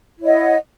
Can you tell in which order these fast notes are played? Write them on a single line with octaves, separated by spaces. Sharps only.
E4 C#5 D#5 F#5